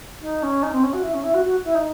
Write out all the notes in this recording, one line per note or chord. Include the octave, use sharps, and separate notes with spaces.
D#4
C#4
D#4
C4
C#4
F#4
E4
C#4
E4
F#4
F#4
E4
D#4